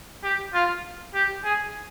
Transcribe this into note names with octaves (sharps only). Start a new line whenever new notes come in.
G4
F4
G4
G#4